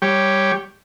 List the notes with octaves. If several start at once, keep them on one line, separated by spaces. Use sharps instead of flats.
G3 G4 C#5